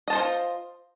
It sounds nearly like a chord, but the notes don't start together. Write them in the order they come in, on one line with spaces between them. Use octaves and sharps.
D#5 A5 C5 A4 F4